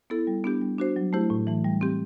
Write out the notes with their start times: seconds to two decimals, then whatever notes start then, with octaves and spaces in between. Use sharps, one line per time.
0.10 B3 E4 A4
0.27 G3
0.44 B3 D4 G4
0.61 G3
0.79 D4 F#4 C5
0.96 F#3
1.13 A3 E4 G4 C5
1.30 A2
1.47 E3 A3
1.64 G3
1.81 C4 G4